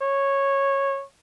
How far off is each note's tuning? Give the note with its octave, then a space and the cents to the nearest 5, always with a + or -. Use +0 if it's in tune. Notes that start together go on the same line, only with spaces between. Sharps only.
C#5 -10